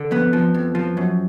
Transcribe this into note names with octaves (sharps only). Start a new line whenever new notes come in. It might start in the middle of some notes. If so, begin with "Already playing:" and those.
Already playing: D3
F2 B3
F3
F2
F3
F#2